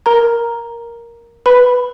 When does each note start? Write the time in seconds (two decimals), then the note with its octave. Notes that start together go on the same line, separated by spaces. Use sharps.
0.06 A#4 A#5
1.46 B4 B5